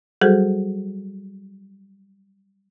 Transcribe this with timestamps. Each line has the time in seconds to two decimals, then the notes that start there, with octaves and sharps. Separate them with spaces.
0.21 F#3 G3 F#4 G#4 A4 C5